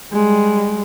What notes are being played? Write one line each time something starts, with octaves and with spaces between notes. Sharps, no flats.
G3 G#3